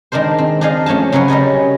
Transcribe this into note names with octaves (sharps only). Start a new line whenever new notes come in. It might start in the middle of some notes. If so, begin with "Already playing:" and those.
D#3 G#3 D4 A#4 C5
C4
D4 D#4 G#4 D#5 F5
F3 A3 C#4 G#5 A5
C#3 F#3 A#4 B4 C#5
G3 C#4 D#5 G#5